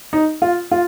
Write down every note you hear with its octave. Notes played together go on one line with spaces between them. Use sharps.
D#4
F4
F4